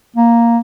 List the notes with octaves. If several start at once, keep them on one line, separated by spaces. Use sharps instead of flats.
A#3